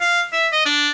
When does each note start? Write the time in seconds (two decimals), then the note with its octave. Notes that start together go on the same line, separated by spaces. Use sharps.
0.01 F5
0.33 E5
0.52 D#5
0.66 D4